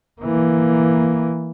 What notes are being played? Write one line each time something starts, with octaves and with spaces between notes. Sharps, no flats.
E3 A#3